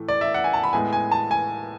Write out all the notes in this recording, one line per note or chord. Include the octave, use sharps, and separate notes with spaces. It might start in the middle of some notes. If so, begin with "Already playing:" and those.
Already playing: A2 E3 A3
D5
E5
F#5
G#5
A5
B5
A2 G#3 B3 G#5
G#5
A5
G#5